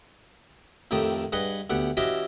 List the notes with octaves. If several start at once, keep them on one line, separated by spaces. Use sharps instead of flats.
F2 A2 D#3 G4 A5 D#6
G2 G#4 B4 D#5 F#5
D2 B3 G4 F#5
E3 C#4 F#4 G4 D#5 E5